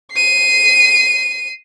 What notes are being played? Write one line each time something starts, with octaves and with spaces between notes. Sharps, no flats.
C7 D#7